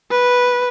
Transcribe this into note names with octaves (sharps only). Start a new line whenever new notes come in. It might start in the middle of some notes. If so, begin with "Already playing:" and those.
B4